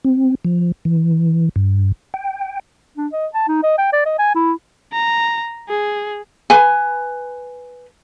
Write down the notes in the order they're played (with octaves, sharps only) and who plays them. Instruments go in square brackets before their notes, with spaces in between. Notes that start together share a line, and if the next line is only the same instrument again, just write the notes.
[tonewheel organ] C4
F3
E3
G2
G5
[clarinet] D4
D#5
A5
D#4
D#5
G5
D5
D#5
G#5
E4
[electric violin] A#5
G#4
[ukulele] B4 G#5